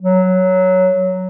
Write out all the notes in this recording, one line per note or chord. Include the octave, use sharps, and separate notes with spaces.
F#3